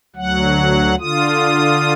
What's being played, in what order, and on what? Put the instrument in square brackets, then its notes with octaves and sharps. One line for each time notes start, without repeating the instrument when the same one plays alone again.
[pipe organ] D2 F#3 F#5
D3 F4 D#6